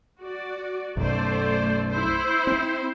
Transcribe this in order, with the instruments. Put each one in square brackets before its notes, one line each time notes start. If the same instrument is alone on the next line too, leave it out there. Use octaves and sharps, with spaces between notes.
[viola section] F#4 D5
[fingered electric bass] B1 F#2 [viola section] A3 C5 D5
[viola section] E4 C5
[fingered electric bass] C4